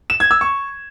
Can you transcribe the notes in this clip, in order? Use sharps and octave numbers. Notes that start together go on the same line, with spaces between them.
E7
G#6
E6
C#6